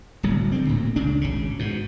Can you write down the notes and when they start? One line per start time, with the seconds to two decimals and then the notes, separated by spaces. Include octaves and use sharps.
0.23 D1 C2 F#3
0.52 D3 C4
0.66 D1 D2 A#2
0.96 C#2 C#3 D4
1.21 G#1 C#3
1.59 G#2 B2